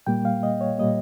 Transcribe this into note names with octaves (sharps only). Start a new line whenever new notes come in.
A#2 G3 A#3 G5
F5
D#5
C#5
A#2 G3 A#3 D#5